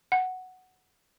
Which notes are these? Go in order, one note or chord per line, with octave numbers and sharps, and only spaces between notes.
F#5